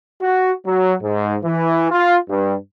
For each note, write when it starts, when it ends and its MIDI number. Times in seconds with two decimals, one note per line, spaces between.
0.22 0.52 66
0.65 0.93 54
1.01 1.35 44
1.44 1.88 52
1.91 2.16 65
2.30 2.54 43